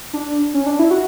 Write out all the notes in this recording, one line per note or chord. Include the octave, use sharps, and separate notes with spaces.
D4
C#4
D4
E4
F#4